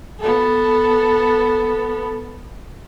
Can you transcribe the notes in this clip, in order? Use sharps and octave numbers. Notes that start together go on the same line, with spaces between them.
B3 A4